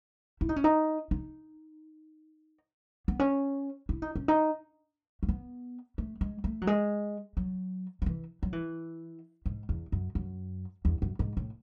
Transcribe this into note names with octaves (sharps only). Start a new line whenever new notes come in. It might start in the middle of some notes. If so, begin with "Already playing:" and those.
E4
D#4
C#4
D#4
D#4
B3
C#4
E4
D#4
C#4
D#4
A3
B3
A3
G#3
A3
F#3
G#3
F#3
D#3
E3
F#3
E3
G#2
E2
F#2
F#2
E2
F#2
G#2
A2